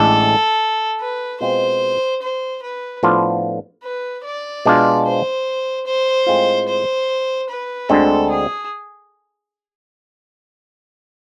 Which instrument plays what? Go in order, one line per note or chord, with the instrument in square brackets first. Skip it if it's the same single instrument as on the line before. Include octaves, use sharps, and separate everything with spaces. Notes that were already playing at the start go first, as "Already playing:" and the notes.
Already playing: [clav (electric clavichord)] A1 A2 G#3 D4 [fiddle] A4
[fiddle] B4
[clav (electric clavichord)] B2 G#3 C4 F4 [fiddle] C5
[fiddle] C5
B4
[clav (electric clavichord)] A2 F3 B3 D4 F4
[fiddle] B4
D5
[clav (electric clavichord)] B2 G#3 D4 F4
[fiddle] C5
C5
[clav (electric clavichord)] A2 G#3 C4 F4
[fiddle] C5
B4
[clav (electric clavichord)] D2 D3 G#3 C4 [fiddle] A4
[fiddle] G#4